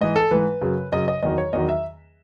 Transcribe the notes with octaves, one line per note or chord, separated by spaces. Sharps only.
G#2 E3 D#5
A4
G#2 E3 B4
F#2 C#3 F#3
F#2 C#3 F#3 D#5
D#5
E2 D#3 F#3 D#5
C#5
E2 D#3 F#3 D#5
E5